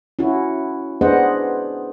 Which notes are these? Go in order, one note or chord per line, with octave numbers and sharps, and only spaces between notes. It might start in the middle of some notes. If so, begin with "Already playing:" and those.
C#4 E4 F#4
B3 D4 G#4 C5 D#5 F#5